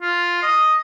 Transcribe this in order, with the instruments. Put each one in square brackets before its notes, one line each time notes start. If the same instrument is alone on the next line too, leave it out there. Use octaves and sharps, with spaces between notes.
[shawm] F4
D#5